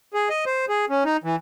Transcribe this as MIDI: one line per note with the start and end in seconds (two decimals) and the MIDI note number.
0.14 0.29 68
0.30 0.45 75
0.46 0.65 72
0.69 0.85 68
0.90 1.04 61
1.05 1.17 63
1.24 1.36 52